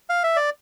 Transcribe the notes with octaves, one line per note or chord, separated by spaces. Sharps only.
F5
E5
D5